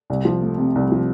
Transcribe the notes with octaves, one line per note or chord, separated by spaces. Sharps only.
C2
F3
A3
C3
C2
F3